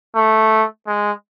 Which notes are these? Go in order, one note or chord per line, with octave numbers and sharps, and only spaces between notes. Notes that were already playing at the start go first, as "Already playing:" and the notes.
A3
G#3